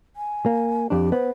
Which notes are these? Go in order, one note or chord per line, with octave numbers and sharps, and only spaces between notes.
G#5
A#3
F2 D4 G4
B3 C5